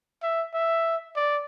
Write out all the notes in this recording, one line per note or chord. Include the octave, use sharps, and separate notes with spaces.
E5
E5
D5